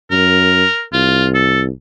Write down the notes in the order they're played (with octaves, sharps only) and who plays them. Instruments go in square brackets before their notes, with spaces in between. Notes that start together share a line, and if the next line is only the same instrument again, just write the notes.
[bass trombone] F#2 [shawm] A#4
[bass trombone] C2 [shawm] F4
[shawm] A4